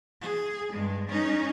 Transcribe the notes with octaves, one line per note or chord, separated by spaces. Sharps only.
G#4
G2 G#3
C#4 D#4